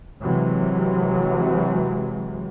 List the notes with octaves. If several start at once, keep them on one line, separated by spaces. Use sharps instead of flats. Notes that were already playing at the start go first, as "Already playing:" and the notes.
C3 E3 F#3 G#3